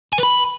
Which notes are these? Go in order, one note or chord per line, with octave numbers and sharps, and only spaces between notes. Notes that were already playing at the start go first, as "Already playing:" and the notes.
G#5
B4
B5